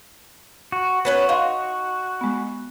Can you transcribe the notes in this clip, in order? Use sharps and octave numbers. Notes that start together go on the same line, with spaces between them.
F#4
B3 C#4 F#4 B4
D#4 F5 C6
G#3 B3